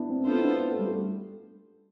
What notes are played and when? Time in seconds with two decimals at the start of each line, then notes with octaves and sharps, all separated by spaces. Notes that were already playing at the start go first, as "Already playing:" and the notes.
Already playing: B3 D4 E4
0.09 C4
0.26 B3 D4 F4 A4 C5
0.38 E4
0.44 D4
0.71 A3
0.79 G3
0.87 A3